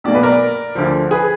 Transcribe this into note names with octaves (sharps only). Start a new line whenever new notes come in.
B1 B2 A#3 D5
B4
A#4 D5
D2 D3 F3
G#4 B4